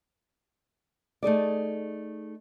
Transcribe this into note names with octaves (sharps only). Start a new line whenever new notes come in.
A3 D#4 G#4 D5